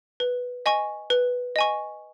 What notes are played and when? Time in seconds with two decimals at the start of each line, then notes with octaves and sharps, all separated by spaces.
0.20 B4
0.66 D#5 G#5 C#6
1.10 B4
1.56 D#5 G#5 C#6